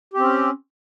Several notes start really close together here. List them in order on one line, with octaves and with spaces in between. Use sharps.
G4 C4 C#4